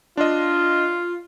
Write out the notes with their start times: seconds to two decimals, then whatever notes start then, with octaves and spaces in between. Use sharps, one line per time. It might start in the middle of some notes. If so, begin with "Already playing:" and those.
0.17 D4 F4 D#5